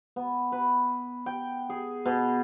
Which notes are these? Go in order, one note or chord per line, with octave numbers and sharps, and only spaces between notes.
B3
B4
G5
G#4
B2